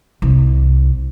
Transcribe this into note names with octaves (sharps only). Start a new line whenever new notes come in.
C2